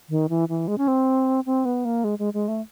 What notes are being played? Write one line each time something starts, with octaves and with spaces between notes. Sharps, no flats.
D#3
E3
E3
G#3
C#4
C4
C4
B3
A#3
G#3
G#3
G#3
A3